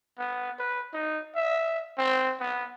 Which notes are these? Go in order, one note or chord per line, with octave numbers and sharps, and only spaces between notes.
B3
B4
D#4
E5
C4
B3